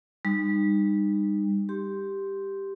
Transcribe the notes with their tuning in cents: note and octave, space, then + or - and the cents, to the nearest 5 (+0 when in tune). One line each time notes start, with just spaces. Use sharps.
G3 +30 D#4 -25
G4 +0 C6 +0